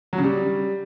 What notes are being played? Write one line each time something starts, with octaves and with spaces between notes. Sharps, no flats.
F#3
C#3
G3